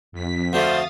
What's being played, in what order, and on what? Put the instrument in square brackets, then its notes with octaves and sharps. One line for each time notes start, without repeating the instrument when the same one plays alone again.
[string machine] F2 B6
[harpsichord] D2 D3 A3 [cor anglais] C5 [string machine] F5 D#6 A6